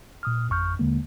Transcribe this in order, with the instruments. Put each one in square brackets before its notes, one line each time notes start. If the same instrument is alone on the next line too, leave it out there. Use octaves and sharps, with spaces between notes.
[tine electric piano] A#2 D#6 F6
G#1 F2 C#6 F6 G6
D#2 D3 G#3 A#3